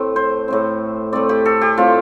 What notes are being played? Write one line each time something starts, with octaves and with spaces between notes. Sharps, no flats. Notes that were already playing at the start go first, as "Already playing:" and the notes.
Already playing: A2 A3 C4
C5
A2 A3 C4
A2 A3 C4 D5
G4
A4
G4
A2 A3 C4 F4